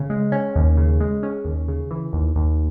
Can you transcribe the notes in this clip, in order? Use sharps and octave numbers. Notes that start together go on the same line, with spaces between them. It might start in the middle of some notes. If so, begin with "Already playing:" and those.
Already playing: C#3
G#3
C#4
D#2
C#3
G#3
C#4
D#2
C#3
E3
D#2
D#2